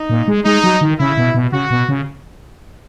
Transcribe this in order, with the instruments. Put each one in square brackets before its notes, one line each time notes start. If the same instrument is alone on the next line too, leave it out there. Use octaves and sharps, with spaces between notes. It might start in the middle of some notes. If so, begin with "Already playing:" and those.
Already playing: [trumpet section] D#4
[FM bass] A#2
G#3
[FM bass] G#3 [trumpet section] D#4
[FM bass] F#3
D#3
[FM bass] C#3 [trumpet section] E4
[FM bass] B2
B2
[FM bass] C#3 [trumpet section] F#4
[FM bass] B2
C#3